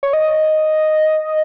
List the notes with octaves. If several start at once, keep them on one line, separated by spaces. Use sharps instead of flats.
C#5
D#5